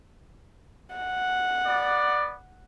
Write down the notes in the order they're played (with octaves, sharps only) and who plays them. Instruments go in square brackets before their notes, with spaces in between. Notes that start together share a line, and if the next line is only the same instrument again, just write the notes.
[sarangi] F#5
[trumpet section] B3 D5